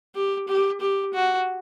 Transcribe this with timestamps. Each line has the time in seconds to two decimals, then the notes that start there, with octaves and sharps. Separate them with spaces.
0.14 G4
0.48 G4
0.81 G4
1.13 F#4